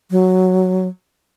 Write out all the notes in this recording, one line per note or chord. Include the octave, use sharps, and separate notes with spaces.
F#3